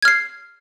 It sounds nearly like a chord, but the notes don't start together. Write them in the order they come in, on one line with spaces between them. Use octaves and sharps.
G#6 F6 C7